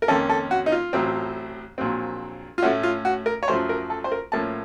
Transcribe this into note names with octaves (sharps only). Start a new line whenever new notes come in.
A#4
F2 D#3 A#3 C#4 A4
A4
F#4
D#4
F4
A1 A2 F#3 C4
A#1 A#2 F#3 C4
F4
A2 A3 C#4 F#4
F4
F#4
A#4
C#5
F#2 F3 A3 C5
A#4
A4
C5
A#4
A2 F3 A#3 C#4 A5